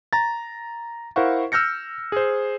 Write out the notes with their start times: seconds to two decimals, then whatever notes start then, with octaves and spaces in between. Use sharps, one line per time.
0.13 A#5 A6
1.16 E4 A#4 C5 F5 F#5 C#6
1.52 E6 F6 G6 A#6 C#7
2.12 G#4 C5